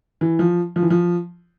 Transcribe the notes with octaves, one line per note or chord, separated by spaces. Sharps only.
E3
F3
F3
E3
F3